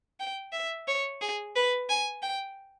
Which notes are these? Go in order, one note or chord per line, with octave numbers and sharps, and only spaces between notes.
G5
E5
C#5
G#4
B4
G#5
G5